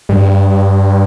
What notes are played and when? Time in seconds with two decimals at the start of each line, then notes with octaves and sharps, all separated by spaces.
0.09 G2